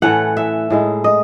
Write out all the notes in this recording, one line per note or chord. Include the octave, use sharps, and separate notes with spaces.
A2 E3 A3 C#4 F#5
E5
A2 G#3 D#4
D#5